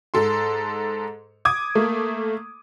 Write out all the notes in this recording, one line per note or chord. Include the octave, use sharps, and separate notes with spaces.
G#2 A4 C6
D6 D#6 G#6
A3 A#3